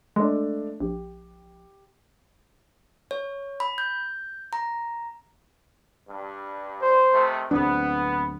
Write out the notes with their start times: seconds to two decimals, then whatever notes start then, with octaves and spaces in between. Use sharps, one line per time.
0.16 G#3 A3 D4
0.80 A#1 G4
3.11 C#5
3.60 B5
3.78 G6
4.53 A#5
6.08 G2
6.82 C5
7.12 C3 D#3 A3
7.51 D1 B3 C4 D4 B4